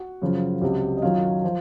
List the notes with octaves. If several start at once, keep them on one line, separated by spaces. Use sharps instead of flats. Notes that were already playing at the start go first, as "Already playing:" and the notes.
Already playing: F#4 F#5
F#2 C#3 F3
C#2 C3 F#3
D#5
F#2 D#3 F#3 F4 F5
F3